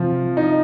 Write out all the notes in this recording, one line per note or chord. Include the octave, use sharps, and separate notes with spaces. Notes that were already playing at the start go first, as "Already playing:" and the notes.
Already playing: C3 F3
D#4